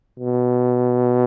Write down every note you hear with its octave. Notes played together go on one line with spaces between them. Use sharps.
B2